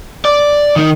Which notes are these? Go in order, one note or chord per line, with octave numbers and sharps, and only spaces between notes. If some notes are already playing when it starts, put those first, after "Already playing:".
D5
D#3 D#4